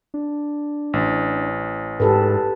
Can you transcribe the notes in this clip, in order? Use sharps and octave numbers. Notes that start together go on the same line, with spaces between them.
D4
A1
G#2 G4 A4 B4